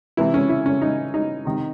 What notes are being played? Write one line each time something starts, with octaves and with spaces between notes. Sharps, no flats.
C3 E3 E4
C#4
E4
C#4
D#4
D#4
C3 D#3